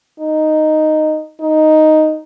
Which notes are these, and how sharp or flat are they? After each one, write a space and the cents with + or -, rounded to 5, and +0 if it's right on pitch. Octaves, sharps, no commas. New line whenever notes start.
D#4 -5
D#4 +0